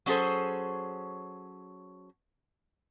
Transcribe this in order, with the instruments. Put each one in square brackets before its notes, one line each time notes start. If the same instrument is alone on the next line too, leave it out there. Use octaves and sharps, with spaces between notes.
[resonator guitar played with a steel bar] F#3 C#4 G#4 A4 C5